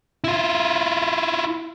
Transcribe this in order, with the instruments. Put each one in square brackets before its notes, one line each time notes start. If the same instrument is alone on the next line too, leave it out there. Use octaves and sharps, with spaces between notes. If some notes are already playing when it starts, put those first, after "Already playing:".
[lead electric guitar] E4 F4